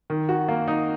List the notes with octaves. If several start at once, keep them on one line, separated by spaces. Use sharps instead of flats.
D#3
F#4
A#3
D#4